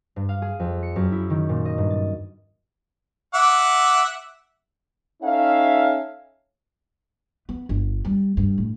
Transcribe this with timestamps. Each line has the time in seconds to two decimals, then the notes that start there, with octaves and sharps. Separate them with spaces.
0.16 G2
0.29 F5
0.42 G#4
0.59 F2
0.83 C#7
0.96 F#2
1.12 E4
1.30 D#3
1.49 A#2
1.65 D#5
1.78 G2
1.90 A6
3.34 E5 F#5 D6
5.23 C#4 D#4 A4 C#5 E5 F5
7.49 B3
7.69 G1
8.05 G3
8.37 G2
8.58 A2